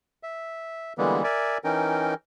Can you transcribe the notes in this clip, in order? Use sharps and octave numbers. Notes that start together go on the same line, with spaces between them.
E5
D3 E3 G3 G#3 A#3 B3
A#4 D5 E5 G#5
E3 C#4 D#4 A#4 G5